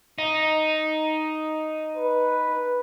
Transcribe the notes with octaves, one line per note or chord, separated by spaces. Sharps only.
D#4
B4